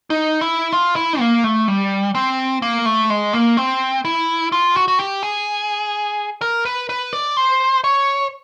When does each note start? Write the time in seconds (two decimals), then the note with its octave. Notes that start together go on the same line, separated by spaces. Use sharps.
0.10 D#4
0.41 E4
0.73 F4
0.96 E4
1.20 A#3
1.44 A3
1.68 G3
2.15 C4
2.62 A#3
2.86 A3
3.10 G#3
3.33 A#3
3.57 C4
4.05 E4
4.52 F4
4.76 F#4
4.88 F#4
4.99 G4
5.23 G#4
6.41 A#4
6.65 B4
6.89 B4
7.13 D5
7.37 C5
7.84 C#5